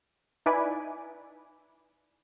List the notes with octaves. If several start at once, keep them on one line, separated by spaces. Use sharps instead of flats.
D#4 E4 B4 D5 G#5